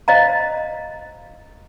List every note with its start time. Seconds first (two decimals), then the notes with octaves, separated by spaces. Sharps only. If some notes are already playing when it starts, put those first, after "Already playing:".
0.08 C5 D#5 F5 A#5